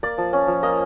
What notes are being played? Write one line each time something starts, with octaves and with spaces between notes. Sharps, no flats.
A#3 D5
F3
C#4
F3
A#3 D#5